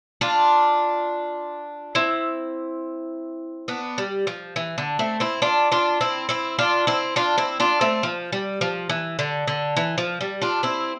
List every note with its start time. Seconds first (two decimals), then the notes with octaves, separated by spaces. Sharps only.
0.21 D4 F4
1.95 C4 E4
3.68 B3 D4
3.98 G3
4.27 F3
4.56 E3
4.78 D3
4.99 A3 C4
5.20 C4 E4
5.42 D4 F4
5.72 D4 F4
6.01 C4 E4
6.29 C4 E4
6.59 D4 F4
6.87 C4 E4
7.16 D4 F4
7.38 C4 E4
7.60 D4 F4
7.81 A3 C4
8.03 F3
8.32 G3
8.61 F3
8.89 E3
9.19 D3
9.48 D3
9.77 E3
9.98 F3
10.21 G3
10.42 D4 F4
10.63 C4 E4